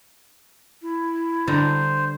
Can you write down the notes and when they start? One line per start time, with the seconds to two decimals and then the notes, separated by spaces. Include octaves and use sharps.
0.82 E4
1.47 D3 G3 C5 A#5